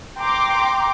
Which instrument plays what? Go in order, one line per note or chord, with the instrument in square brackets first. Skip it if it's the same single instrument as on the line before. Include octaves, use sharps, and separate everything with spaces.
[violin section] G5 A#5 C6 D6